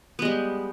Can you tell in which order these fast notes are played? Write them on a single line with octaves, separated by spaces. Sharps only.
B3 G#3 G3